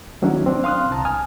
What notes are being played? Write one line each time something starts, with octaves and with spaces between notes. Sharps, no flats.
D#3 F#3 A#3 C#4 D4 E4
C4 D4
F5 C6 D#6 F6 F#6
C2 A5 A#5
G#5 D#6 F6